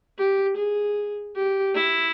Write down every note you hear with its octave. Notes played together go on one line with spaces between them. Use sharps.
G4
G#4
G4
E4